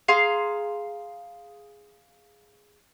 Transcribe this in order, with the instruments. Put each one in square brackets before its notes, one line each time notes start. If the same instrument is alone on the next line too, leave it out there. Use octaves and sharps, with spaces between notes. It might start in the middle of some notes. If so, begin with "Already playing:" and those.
[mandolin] G#4 F5 A#5 C6